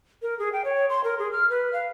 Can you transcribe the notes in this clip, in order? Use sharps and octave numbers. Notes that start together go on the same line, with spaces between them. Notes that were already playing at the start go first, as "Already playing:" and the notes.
A#4
G#4
G5
C#5
C6
A#4
G#4
F6
B4
F5